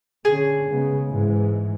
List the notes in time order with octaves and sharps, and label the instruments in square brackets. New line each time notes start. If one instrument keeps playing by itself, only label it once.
[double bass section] D3 C#4 [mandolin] G#4
[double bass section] C#3 G#3 B3
G#2 E3 G#3